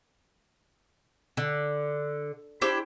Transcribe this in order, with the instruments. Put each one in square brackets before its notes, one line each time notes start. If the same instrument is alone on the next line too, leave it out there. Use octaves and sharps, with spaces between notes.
[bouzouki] D3
D4 E4 G4 C5